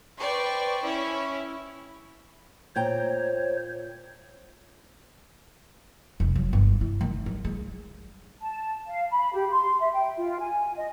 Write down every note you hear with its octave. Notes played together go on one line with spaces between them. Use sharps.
B4 C5 D5 G5 C#6
C#4 E4 C#5
A#2 C5 C#5 G5 A#5
F1
F#3
G1
E4
D#3
F#3
G#3
A5
F5
B5
G4
C6
E5
G5
F4
G#5
D#5